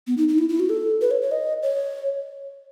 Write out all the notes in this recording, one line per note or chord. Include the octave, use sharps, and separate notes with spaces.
B3
D#4
D#4
E4
E4
F#4
A4
B4
C#5
C#5
D#5
C#5